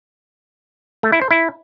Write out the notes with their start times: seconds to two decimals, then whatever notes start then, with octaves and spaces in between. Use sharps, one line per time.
1.03 A3
1.12 E4
1.21 C5
1.31 E4